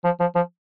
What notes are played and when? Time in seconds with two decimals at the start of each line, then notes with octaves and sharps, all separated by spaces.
0.05 F3
0.20 F3
0.35 F3